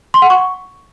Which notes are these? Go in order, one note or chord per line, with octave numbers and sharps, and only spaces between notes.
C6
F#5
C#6